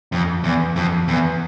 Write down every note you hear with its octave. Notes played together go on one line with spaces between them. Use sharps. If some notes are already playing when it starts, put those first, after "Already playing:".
F2
E2
F2
E2